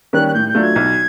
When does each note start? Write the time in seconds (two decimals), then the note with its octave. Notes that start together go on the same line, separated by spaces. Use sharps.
0.13 D#3 G3 A#3 C#4 F#6
0.27 F#6
0.34 A2 G6
0.48 G6
0.55 F#3 A3 D4 F4
0.62 G#6
0.76 B1